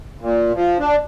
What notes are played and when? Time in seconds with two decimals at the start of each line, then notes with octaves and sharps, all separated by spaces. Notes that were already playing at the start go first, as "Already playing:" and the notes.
0.21 A#2
0.54 F3
0.79 D4